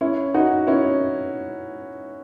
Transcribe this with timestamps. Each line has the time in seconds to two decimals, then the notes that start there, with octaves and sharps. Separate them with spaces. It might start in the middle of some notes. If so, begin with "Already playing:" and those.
0.01 C#4 E4
0.34 D#4 F#4
0.67 C#4 E4